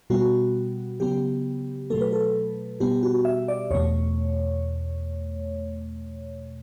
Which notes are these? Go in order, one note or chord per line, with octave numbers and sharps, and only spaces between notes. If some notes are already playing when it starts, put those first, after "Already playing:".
B2 G3 B3 F#4
C#3 F#3 B3 G4
B2 F#3 A3 A4
B4
A4
B2 G3 B3 G4
F#4
E5
D5
E2 B2 A3 C#5